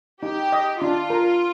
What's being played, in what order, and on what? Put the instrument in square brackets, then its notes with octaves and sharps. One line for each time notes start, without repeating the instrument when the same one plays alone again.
[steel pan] D#4 [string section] G4
[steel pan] D#5
[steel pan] D4 [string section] F4
[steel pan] A#4